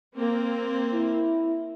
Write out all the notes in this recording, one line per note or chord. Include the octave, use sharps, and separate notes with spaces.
A#3 C4
E4